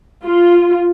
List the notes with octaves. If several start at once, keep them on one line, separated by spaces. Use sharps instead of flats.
F4